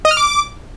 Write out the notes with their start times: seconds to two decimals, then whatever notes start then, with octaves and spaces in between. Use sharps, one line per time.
0.05 D#5
0.11 F6
0.17 D6